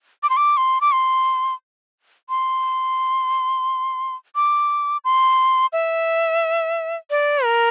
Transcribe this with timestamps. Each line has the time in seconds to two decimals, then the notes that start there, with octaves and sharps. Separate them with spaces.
0.23 D6
0.30 C6
0.37 D6
0.57 C6
0.81 D6
0.92 C6
2.29 C6
4.35 D6
5.04 C6
5.73 E5
7.10 D5
7.44 A#4